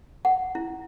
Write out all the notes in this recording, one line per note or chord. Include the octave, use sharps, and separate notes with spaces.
F#5
E4